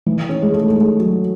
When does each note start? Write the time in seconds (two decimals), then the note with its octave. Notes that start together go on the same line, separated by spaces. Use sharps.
0.06 E3
0.29 C#4
0.42 G#3
0.53 A3
0.68 A3
0.75 G#3
0.99 F#3